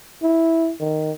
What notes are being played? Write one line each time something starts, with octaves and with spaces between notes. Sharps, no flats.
E4
D#3